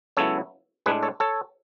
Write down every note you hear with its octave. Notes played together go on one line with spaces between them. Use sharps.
C#2 C#3 F#3 B3 E4 A4 C#5
A2 G#3 D4 G#4 B4
A4 C#5
A4 C#5